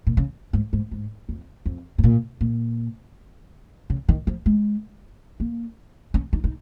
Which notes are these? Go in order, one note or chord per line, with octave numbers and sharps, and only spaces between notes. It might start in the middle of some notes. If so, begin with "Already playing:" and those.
A#2
C#3
G#2
G#2
G#2
F2
F2
G#2
A#2
A#2
C#3
D#3
F3
G#3
A#3
C#4
D#4
D#4